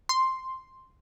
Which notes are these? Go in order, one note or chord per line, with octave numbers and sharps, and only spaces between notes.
C6